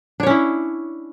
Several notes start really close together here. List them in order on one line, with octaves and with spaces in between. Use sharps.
D4 C#5 C#4 E4